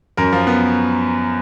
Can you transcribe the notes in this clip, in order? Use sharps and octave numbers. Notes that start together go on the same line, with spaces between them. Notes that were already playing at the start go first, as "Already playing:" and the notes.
F#2 A#4
F3
B3